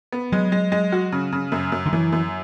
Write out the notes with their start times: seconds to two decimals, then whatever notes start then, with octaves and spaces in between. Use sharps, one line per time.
0.12 B3
0.32 F#3 G#3
0.52 G#3
0.72 G#3
0.92 F#4
1.12 C#3
1.32 C#3
1.52 F#2
1.72 F#2
1.86 D3
1.93 F#2 E3
2.12 F#2